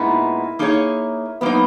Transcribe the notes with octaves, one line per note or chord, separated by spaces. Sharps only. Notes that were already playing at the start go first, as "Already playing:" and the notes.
Already playing: A#2 G#3 B3 D#4 E4
A#3 D#4 G#4 C#5
F#3 A#3 B3 D#4